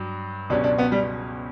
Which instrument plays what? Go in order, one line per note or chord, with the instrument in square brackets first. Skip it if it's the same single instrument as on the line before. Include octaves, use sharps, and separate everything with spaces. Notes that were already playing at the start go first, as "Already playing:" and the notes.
Already playing: [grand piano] G2 F#3
[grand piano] C#2 B2 F#3 C#4 G4 [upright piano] D4
[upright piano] D4
B3
G3